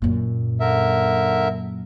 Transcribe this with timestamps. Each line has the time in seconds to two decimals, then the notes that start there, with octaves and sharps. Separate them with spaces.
0.02 F#2 A#2
0.60 D3 A#4 E5